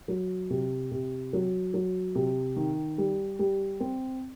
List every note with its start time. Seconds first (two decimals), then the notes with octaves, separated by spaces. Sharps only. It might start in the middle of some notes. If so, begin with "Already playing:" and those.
0.08 F#3
0.50 C3
0.91 C3
1.33 F#3
1.74 F#3
2.15 C3
2.56 D#3
2.98 G3
3.39 G3
3.80 C4